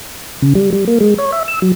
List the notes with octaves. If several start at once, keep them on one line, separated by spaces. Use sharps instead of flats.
C#3
G3
G3
A#3
G#3
C#5
E5
E6
F#3